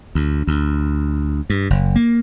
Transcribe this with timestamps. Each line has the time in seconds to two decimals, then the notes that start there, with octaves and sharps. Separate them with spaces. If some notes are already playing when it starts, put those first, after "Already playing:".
0.15 D2
0.47 D2
1.50 G2
1.70 F#1
1.96 A#3